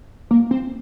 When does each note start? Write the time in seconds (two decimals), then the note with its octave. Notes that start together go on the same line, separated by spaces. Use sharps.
0.31 A#3
0.51 C4